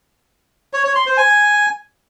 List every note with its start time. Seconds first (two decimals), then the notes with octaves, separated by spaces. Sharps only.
0.73 C#5
0.84 C#5
0.95 C6
1.06 C5
1.17 G#5